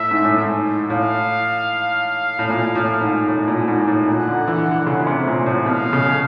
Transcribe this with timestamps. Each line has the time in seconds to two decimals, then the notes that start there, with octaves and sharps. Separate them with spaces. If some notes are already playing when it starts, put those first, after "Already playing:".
Already playing: A2 E5
0.11 G#2
0.24 A2
0.36 G#2
0.90 A2 F5
2.39 A2
2.49 A#2
2.75 A2
3.01 G#2
3.28 A2
3.48 A#2
3.68 G#2
3.88 A2
4.08 A#2 F#5
4.27 D3
4.48 E3
4.67 D3
4.87 C#3
5.07 C3
5.27 A#2
5.46 A2
5.66 B2 F5
5.93 C#3